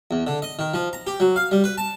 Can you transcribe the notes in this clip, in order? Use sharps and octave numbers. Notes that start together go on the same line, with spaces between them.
E2
D3
D#5
D#3
F3
A#5
G4
F#3
F5
G3
B4
A5